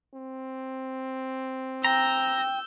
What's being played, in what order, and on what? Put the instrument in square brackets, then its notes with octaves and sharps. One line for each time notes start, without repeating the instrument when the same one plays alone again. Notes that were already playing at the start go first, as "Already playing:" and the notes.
[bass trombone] C4
[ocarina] G5 [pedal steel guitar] A#5 [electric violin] E6 G6